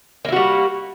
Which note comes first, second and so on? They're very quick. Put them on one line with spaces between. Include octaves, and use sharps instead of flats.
A#3 E4 F#4 G3